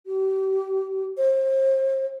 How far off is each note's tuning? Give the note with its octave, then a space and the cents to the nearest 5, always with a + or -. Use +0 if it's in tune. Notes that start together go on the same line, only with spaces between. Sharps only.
G4 -35
C5 +35